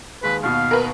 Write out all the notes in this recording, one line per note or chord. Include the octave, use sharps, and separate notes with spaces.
D#2 G#3 B4
D#2 B2 F5
A#4 B4